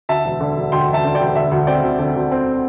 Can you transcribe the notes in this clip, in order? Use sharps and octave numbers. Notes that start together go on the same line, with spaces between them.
D2 E5 A5
E1
D3
E1
D2 G5 C6
E1
E5 A5
D3
D5 G5
E1
D3 E5
D2
C4 D5 G5
D2
D3
D2
C4